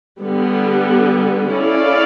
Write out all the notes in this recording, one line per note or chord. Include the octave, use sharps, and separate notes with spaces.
D3 G3 B3
C#4 E4 A4 D5 F5